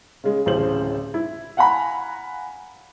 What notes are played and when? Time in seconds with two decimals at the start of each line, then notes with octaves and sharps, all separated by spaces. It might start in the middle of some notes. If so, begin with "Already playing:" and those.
0.24 C#3 G#3
0.46 D1 A1 C#3 C5 F#7
1.14 E4
1.57 F5 F#5 G#5 A#5 B5